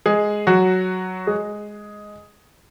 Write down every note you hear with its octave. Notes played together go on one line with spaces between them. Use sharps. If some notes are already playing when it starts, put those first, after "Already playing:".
G#3 G#4
F#3 F#4
G#3 G#4